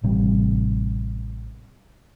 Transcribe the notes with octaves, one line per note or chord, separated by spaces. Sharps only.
A1 C3 G3